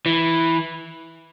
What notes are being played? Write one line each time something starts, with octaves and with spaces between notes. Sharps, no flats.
E3